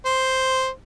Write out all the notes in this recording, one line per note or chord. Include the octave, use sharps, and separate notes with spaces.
C5